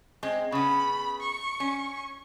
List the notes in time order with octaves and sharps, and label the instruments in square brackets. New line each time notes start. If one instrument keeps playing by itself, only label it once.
[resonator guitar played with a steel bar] G#3 C4
[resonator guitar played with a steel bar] C#3 B3 [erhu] B5
[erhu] C#6
[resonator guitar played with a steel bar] C#4